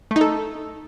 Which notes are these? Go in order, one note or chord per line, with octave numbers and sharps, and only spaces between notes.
A3
D#4
A4